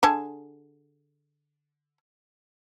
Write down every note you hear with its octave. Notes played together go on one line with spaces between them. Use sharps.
D3 G#4 A5